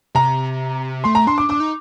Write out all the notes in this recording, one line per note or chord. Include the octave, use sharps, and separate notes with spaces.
C3 A#5
A3 C6
A#5
D4 C6
D6
D4 D6
D#4